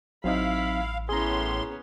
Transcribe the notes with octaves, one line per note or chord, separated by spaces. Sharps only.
A1 F#3 C4 D#4 E4 F5 B5
A2 B3 C#4 G#4 A#5 C6